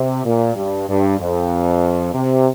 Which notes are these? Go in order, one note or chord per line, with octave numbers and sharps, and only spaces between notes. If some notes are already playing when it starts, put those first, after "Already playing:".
Already playing: C3
A#2
G2
G2
F2
C3